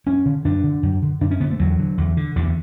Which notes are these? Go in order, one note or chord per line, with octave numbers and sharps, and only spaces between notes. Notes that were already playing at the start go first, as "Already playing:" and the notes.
F#2 C#4
D3
F#2 D4
D3
F#2
D3
F#2 D4
C#4
D3 B3
A3
E2 F#3
D3
E2
D3
E2 D3